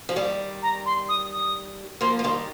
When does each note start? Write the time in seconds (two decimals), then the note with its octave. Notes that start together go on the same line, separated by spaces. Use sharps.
0.09 F3
0.16 D#3 G3
0.62 A#5
0.86 C6
1.09 D#6
1.32 D#6
2.01 F3 A#3 C6
2.19 A#3
2.24 D#3 G3 C6